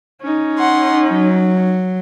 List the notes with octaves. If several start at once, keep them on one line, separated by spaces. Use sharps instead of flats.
C#4 D#4
F#5 C6
F#3